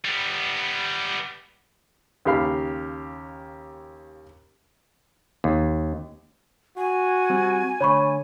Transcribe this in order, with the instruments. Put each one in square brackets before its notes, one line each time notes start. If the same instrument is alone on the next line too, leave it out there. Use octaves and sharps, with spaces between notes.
[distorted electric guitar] G3 B3
[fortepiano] D#2 C#3 G4 F5 B5 F6
[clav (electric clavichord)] D#2
[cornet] F#4 [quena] G#5
[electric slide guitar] G3 C4
[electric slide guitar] D3 A3 [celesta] C#5 B5 C#6